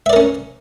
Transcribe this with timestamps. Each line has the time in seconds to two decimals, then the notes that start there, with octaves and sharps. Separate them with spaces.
0.06 E5
0.10 D5
0.13 A#4
0.16 C#4